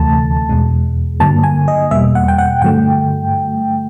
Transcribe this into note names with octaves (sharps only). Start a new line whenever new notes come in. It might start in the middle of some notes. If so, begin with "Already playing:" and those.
Already playing: D2 C3 E3 A3 A5
E2 B2 G#3
G2 D3 F#3 A#3 A5
G#5
D#5
E2 B2 G3 A#3 E5
F#5
G5
F#5
G2 D3 F#3 A3 G5